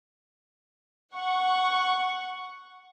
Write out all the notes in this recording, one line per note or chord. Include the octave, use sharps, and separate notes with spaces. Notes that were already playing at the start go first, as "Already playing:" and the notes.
F#5 C#6